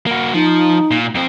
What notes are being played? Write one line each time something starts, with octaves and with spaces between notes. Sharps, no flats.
A#3 F#4
F3 D#4
A#2
F2 C4